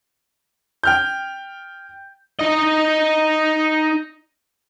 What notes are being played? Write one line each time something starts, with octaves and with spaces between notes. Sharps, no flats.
G5 F6 G6
D#4 D#5